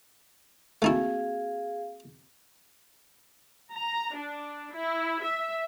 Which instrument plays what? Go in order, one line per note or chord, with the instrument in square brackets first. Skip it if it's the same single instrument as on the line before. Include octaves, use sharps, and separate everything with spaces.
[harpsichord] A3 D#4 E4 [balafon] A#3 C4 F#4 [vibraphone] G#4 F5
[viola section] A#5
D4
E4
E5